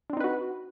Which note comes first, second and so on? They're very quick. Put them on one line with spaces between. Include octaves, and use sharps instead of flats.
D4 C4 D#4 B4 F#4